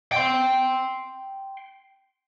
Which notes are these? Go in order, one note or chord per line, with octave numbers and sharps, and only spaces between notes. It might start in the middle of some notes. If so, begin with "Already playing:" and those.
G5 C6